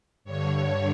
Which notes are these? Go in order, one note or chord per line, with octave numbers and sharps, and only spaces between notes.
G2 D3 C#5
C#5